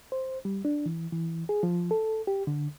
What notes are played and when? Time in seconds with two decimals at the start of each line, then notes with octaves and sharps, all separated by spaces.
0.12 C5
0.45 G3
0.65 D4
0.86 E3
1.13 E3
1.49 G#4
1.63 F3
1.91 A4
2.27 G4
2.47 D3